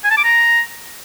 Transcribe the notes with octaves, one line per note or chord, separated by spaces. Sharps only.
G#5
A5
D6
A#5